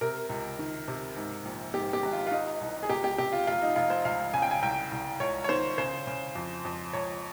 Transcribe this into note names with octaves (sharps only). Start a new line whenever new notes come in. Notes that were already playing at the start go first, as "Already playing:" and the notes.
C3 A#4
C#2
D#3
C3
G#2
A#1
G#2 G4
G4
G#1
F4
F4
D#3 D#4
C2
G#4
C#2 G4
G4
C3 G4
F4
F1 F4
D#4
F1 F4
C5
C#2 F5
C#3 G#5
G5
G#5
C2 G5
C2
C#2 C#5
C#5
D#3 C5
C#3 C5
C#3
F2
F2
C#2 C#5